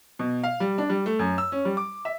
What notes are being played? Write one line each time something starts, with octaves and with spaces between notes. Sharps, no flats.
B2
F5
G3
D4
G3
A3
F#2
E6
C#4
G3
D6
E5